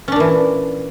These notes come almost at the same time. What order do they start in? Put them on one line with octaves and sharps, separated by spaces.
C#4 D4 A#2 E3